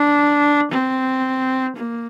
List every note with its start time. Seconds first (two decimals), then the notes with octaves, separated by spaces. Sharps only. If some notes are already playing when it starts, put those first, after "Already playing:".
Already playing: D4
0.71 C4
1.76 A#3